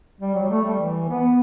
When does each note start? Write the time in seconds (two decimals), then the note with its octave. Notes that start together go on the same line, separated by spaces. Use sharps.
0.21 G3
0.35 F#3
0.43 G3
0.50 A3
0.65 G3
0.80 E3
1.09 B3